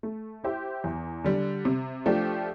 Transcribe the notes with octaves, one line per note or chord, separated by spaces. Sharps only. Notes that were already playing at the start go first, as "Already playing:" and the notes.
A3
E4 G4 C5 E5
E2
D3 G3
C3
F3 A3 D4 G4